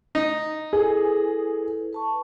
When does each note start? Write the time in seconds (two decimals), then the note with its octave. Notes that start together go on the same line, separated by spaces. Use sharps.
0.15 D#4
0.73 E4 G#4 A4 B4
1.93 B4 A5 C#6